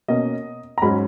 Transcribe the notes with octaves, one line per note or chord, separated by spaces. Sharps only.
B2 A#3 C#4 D#5
A#5
G#2 F#3 C#4 B5